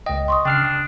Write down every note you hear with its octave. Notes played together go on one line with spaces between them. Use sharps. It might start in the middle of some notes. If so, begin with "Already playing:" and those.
C#2 D#5 G5
C6 C#6 D#6
C#3 D4 G5 F6 C7
D#6